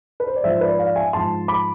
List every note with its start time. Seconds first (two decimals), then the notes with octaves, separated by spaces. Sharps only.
0.20 B4
0.27 C5
0.36 D5
0.44 G#2 F3 C5 E5
0.61 B4 D5
0.78 D5 F5
0.95 E5 G#5
1.13 G#2 F3 A5 C6
1.48 B5 D6